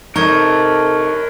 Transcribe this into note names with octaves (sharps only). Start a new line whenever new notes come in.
C3 D#4 A4 A#4 C#5 A#5 C#6 G#6